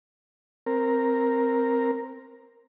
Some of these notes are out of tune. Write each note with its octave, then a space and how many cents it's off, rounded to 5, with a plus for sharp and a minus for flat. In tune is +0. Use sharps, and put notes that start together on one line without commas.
C4 +0 A#4 +0